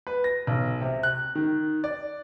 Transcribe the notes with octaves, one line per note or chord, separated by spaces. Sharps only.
B4
A#6
B1
C3
F#6
D#3
D5